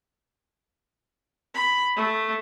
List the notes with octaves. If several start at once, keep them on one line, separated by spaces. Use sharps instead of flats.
B5
A3